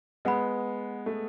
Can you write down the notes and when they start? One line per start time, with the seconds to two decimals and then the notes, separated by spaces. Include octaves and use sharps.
0.25 G#3 B3 B4 F#5 B5
1.06 A3